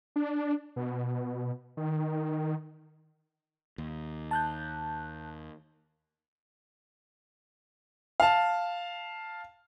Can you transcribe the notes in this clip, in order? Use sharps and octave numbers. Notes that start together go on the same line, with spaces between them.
D4
B2
D#3
D#2
A5 F#6 G6
F5 A5